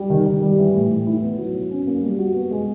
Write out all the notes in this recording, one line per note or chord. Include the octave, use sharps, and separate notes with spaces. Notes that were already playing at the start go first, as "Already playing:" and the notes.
Already playing: G3
D#3
D#3
G3
E3
A2
A2
E4
B3
F#3
F#3
C#4
A#3
G3
F#4
B3
G#3